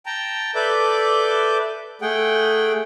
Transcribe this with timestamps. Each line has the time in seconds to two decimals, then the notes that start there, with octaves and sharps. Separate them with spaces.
0.06 G5 A5 A#5
0.55 A4 B4 D5 E5 D6 G6
2.02 A3 G#4 F#5 G5